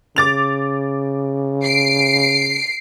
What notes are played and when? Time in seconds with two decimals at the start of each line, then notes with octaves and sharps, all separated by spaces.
0.16 C#3 D6 A6 F7
1.63 C7 D7